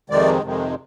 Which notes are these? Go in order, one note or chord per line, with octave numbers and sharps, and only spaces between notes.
F2 C3 D#3 G#3 D5
F2 C3 D#3 G#3